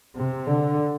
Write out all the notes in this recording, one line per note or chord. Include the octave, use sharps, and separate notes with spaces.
C3
D3